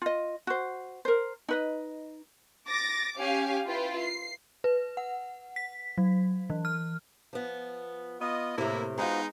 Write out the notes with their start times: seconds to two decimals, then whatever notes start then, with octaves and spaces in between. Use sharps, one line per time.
0.02 F4 D#5
0.47 F#4 C5
1.05 A#4 C5
1.48 D#4 B4 D#5
2.68 D6 A6 A#6
3.18 C#4 G4 F5 G#5
3.66 E4 F4 B4 G5
3.98 C7
4.64 B4
4.97 F#5
5.56 B6
5.98 F#3
6.50 E3
6.65 F6
7.33 F3 B3
8.21 B3 F4 D#5
8.58 A2 C3 A#3 E4
8.98 G#3 B3 D#4 F4 F#4 C5